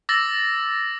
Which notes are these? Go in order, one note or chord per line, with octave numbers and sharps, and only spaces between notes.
D6 E6 A6 A#6